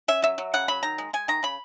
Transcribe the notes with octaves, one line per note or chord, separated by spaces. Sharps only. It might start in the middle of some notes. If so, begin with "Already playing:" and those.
C#4 E5
F#3 E5
F#3
C#3 F#5
F#3 B5
D#3 A#5
G#3
G#3 G#5
D#3 A#5
C#3 B5